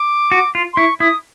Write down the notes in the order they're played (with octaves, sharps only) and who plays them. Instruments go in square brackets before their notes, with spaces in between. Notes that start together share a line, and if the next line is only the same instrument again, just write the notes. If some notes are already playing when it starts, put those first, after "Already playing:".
Already playing: [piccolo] D6
[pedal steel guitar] F#4
F4
[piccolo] C6
[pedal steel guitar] E4 [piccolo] C#6
[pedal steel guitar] E4 [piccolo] D#6